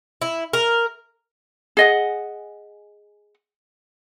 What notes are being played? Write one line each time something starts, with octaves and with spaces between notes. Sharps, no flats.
E4
A#4
G#4 D#5 F#5